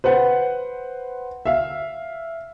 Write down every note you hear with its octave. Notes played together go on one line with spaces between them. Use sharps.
B4 C5 F#5
E5 F5